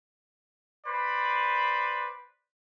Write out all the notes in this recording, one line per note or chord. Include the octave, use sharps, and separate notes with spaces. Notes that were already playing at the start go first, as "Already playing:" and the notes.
B4 C5 D5 B5